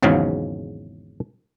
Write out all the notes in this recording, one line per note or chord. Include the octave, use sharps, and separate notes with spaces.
G#1 E2 G#2 C#3 F#3 F5